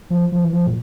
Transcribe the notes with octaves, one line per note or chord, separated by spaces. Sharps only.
F3
F3
E3
F3
A#2